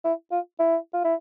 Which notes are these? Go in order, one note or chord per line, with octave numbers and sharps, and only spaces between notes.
E4
F4
E4
F4
E4